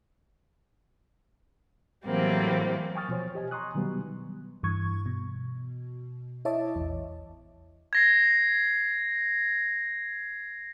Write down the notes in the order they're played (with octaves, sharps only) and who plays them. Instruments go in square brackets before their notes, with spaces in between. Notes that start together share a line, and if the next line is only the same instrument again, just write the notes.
[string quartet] A2 E3 F#3 G3 A#3 C4
[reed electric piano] G5 G#5 C#6 D#6 F6 A6
B2 F3 C5 C#5
G4 D#5 G#5
G#5 A#5 C6 C#6 D#6 F#6
B2 D#3 F#3 G3 B3
[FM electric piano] G2 E3 C#6 G#6
B2
E4 C#5 D#5 E5 A5 D6
A#1 E2
[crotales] G#6 A#6 C7